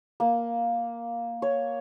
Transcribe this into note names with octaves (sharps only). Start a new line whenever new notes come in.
A#3
C#5